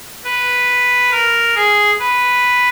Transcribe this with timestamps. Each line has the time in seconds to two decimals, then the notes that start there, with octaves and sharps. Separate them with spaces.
0.24 B4
1.11 A#4
1.55 G#4
2.00 B4